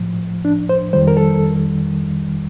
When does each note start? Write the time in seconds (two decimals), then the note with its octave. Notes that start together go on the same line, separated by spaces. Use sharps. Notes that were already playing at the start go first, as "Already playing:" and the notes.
Already playing: A2 F3
0.45 D4
0.69 C5
0.93 F2 D#3 G3 C5
1.08 A#4
1.17 A4